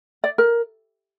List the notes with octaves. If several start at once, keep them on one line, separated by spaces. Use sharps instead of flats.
D5
A#4